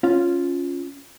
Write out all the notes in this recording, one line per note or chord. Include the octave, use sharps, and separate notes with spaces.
C#4 F4